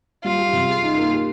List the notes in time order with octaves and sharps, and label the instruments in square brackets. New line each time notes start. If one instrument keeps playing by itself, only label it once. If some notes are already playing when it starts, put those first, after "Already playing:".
[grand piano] G3 [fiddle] F4
[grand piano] G4
C3
G#4
D#4
A#3
G4